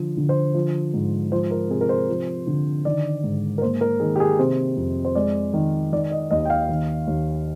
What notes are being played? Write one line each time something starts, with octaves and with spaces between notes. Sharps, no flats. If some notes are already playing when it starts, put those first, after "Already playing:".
Already playing: D3 F3
D3
C5
F3
G#2
F3 C5
A#4
C3 G#4
A#4
C5
F3
D3
D#3 D5
G#2
A#4
A#3 C5
A#4
D#3 G#4
G4
G#4
C3 C5
F2
C5
G#3 D5
D#3
D#3 D5
D#5
D#2 D#5
G5
F5
D#3
D#2